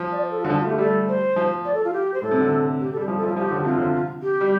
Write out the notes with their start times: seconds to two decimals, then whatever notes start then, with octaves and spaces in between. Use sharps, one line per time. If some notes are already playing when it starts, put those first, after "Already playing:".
Already playing: F3
0.12 D5
0.21 C5
0.31 A4
0.40 F4
0.44 D3
0.50 F3 D4
0.60 F4
0.65 A3
0.69 G4
0.78 G3 A4
1.08 C5
1.36 F3
1.65 D5
1.74 A4
1.85 F4
1.93 G4
2.14 C5
2.22 A2 A4
2.31 C3
2.41 D3
2.80 G4
2.93 A4
2.97 G3 G4
3.08 F3 F4
3.18 A4
3.23 F3
3.28 F4
3.36 F3 G4
3.51 D3
3.64 C3 F4
3.77 D3
4.23 G4
4.41 G3